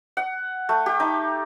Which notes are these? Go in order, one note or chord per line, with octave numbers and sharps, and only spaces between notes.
F#5
A3
G4
D#4